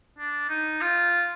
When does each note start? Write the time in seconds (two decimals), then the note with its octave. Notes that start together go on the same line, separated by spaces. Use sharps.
0.18 D4
0.49 D#4
0.81 F4